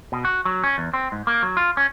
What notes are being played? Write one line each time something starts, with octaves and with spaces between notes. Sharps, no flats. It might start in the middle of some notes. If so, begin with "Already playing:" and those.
B2
F#4
F#3
C#4
E2
C4
G#2
A#3
F#3
F4
C#4